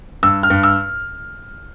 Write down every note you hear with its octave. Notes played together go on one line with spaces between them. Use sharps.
G2 E6
F6
G2
E6